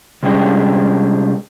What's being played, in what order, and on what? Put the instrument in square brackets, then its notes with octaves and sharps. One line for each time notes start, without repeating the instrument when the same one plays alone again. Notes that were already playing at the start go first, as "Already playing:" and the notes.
[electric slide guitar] C3 G3 G#3 C#4 D4 G4